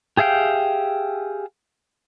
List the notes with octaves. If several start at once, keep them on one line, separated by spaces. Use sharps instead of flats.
G4 G#4 E5 F5 G5